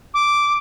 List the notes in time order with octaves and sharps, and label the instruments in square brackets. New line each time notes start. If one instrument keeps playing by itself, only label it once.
[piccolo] D6